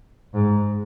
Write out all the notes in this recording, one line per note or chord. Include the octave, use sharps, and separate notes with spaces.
G#2